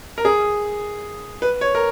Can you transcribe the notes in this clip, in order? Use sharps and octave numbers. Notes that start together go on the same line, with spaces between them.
A#4
G#4
B4
C#5
A#4